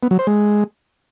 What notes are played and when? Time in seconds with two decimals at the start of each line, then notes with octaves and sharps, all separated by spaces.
0.03 B3
0.11 F#3
0.19 C5
0.27 G#3